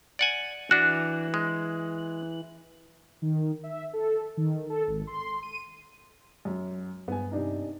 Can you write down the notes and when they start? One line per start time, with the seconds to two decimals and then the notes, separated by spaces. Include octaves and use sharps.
0.19 D5 F#5 G#5
0.71 E3 D4 F#4 F#6
1.34 G#3
3.22 D#3
3.63 E5
3.93 A4
4.37 D#3
4.70 A4
4.88 G#1
5.07 C6
5.43 D#7
6.45 F#2
7.08 G2 B3 G#5
7.31 C3 D4 D#4